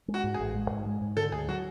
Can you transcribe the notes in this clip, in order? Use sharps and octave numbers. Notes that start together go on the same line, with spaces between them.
G#3
F#4
G#2
G#4
A1
G#3
G#2
G#3
G#2
D3 A4
D2 G#4
F#3 F#4